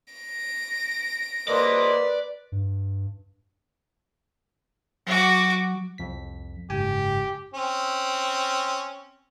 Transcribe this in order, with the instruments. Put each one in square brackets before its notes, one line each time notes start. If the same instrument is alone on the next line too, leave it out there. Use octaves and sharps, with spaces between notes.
[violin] A#6 D7
[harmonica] A#3 C5 D#5 [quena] B4 [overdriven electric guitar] D5
[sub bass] G2
[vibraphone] F#3 [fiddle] F#4 D6
[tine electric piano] C2 F2 B6
[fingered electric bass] F#1 G#2 [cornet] G4 [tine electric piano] G#5
[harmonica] C4 C#4